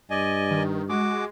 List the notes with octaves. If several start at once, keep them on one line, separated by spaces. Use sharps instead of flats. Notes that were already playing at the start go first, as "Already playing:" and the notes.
G2 D5 D#5 G#5
D#3
G#3 F#4 D6